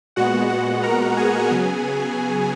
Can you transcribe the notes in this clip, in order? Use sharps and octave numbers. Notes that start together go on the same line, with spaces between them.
A#2 G#3 B3 F#4 F#5
F#4 F#5
A#4 A#5
G#4 G#5
C#3 F#3 B3